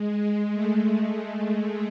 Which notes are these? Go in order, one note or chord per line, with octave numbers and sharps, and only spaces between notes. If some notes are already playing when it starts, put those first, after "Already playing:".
Already playing: G#3
G#3
A3